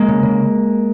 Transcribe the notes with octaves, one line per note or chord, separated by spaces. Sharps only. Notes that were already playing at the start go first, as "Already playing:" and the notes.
Already playing: G#3 A#3
C#3
C#3